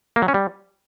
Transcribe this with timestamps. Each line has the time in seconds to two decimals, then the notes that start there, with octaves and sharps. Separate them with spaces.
0.16 A#3
0.22 F#3
0.28 C#4
0.34 G3